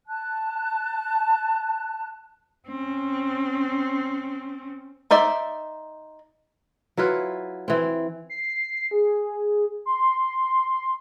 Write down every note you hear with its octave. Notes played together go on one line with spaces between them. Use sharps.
A5 F#6
C4 C#4
D#4 C5 D5 E5
F#3 E4 F4 B4
E3 C4
C7
G#4
C6